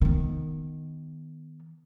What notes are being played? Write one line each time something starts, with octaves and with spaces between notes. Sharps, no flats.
D#3 B3